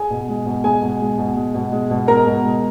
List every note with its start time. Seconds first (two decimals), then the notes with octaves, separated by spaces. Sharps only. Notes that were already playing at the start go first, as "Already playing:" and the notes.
Already playing: G#4 G#5
0.10 B2
0.28 G#3
0.45 B2
0.64 G#3 G#4 G#5
0.82 B2
1.00 G#3
1.18 B2
1.36 G#3
1.54 B2
1.72 G#3
1.90 B2
2.08 G#3 A#4 A#5
2.26 B2
2.44 G#3